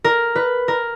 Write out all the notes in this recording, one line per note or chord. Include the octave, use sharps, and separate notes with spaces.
A#4
B4
A#4